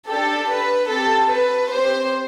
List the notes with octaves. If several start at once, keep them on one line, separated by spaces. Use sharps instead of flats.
D4 G4 A4
B4
C4 G4 A4
B4
C4 G4 C5